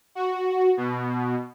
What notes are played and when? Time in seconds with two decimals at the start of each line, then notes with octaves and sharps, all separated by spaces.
0.15 F#4
0.77 B2